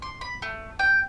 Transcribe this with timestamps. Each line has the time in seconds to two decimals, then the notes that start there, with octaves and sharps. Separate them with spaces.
0.02 C6
0.21 B5
0.42 A3
0.79 G5